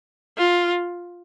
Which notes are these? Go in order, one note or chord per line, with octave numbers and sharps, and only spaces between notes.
F4